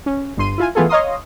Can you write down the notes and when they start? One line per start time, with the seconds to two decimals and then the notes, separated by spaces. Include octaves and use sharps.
0.06 C#4
0.37 G1 G2 C6 D#7
0.58 E4 F4 G#5
0.75 E3 A3 B3 F4 G#4 A4
0.89 C#5 D#5 F5 A#5 C6 D#6